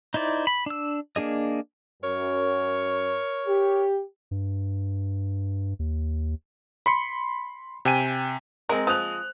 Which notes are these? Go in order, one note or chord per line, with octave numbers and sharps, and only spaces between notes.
D#4 E4 C5 D5
B5
D4 E6
A#3 D4 G#4 D#5
F#2 A#4 C#5
G4
G2
D#2
B5 C6 C#7
C3 G5 G#5 D#7
G#3 C4 A#4
F3 D#6 F#6 F7